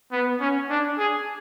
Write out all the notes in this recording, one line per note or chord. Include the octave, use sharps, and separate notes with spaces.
B3
C#4
D4
G#4